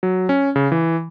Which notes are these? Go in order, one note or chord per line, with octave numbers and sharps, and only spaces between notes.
F#3
C#4
C#3
E3